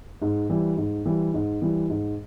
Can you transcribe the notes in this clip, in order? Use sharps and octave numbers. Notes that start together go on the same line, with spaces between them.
G#2
E3 G3
G#2
E3 G3
G#2
E3 G3
G#2